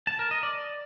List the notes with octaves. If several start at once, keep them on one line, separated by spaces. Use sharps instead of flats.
A5
A#4
D#5
D5